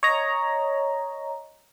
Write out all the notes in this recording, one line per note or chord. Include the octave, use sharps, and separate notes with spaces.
C#5 D#5 A#5